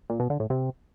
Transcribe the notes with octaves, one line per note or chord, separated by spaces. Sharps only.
A#2
B2
D3
A2
C3